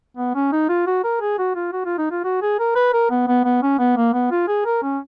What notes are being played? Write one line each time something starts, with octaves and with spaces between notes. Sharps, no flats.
B3
C#4
D#4
F4
F#4
A#4
G#4
F#4
F4
F#4
F4
D#4
F4
F#4
G#4
A#4
B4
A#4
B3
B3
B3
C#4
B3
A#3
B3
F4
G#4
A#4
C#4